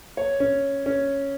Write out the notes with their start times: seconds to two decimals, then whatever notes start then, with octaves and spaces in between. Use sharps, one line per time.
0.17 C#5
0.40 C#4
0.86 C#4